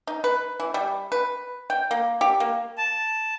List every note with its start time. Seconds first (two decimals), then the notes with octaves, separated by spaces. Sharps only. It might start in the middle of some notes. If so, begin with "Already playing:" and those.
0.07 D#4
0.24 B4
0.60 E3
0.74 G3
1.12 B4
1.70 G5
1.91 A#3
2.21 G4
2.40 A#3
2.78 A5